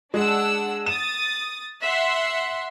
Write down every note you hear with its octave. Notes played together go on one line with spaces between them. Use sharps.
G#3 D4 F#5 E6
D#6 A6 E7
E5 F#5 C6